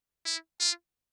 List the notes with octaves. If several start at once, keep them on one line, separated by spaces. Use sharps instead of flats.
E4
F4